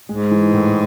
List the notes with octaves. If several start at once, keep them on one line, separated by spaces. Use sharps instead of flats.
G#2 G#3
E3
A2